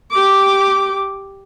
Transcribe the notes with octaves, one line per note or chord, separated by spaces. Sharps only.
G4 D6